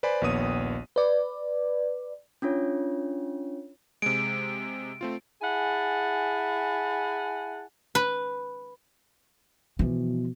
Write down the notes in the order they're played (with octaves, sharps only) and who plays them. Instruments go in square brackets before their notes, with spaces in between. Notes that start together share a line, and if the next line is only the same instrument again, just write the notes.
[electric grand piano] B4 C5 D5 G#5 B5
A#1 D#2 B3 C#5 D#6 D#7
[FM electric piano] B4 D5
[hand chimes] C#4 D4 F4 C#5
[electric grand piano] C3 G#3 [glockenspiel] D7
[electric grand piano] A3 C4 F4
[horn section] E4 G#4 F#5 G#5 A5
[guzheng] B4
[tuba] B2 [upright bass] E3 F3